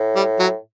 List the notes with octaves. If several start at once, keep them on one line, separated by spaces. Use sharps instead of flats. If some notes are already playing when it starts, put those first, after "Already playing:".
Already playing: A2
G3
F#3